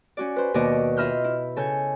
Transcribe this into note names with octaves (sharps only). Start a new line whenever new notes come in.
C#4 F#4 D5
B4 C5
D#2 B2 F#4 D5 D#5
F4 D#5 E5 B5 F6 G6
E4
C#3 A4 C#5 G#5 G6